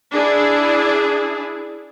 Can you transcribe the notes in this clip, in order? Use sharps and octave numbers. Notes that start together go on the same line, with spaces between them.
D4 E4 G#4